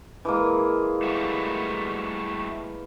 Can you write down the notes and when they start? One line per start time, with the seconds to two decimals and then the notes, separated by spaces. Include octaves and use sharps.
0.25 E3 G#3 A#3
1.03 G3 A3 F#4